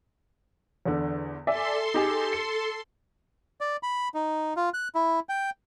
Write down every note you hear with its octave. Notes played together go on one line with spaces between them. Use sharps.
E2 D3
A4 D5 E5 G#5 C6
D#4 G4 G#4
C#7
D5
B5
D#4
F4
F#6
E4
G5